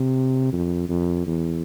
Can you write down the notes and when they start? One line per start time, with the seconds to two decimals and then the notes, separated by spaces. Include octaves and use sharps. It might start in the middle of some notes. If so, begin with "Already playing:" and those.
Already playing: C3
0.52 F2
0.89 F2
1.27 E2